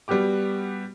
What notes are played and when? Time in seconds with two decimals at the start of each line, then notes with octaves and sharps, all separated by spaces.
0.08 G3 B3 F#4 G4 D6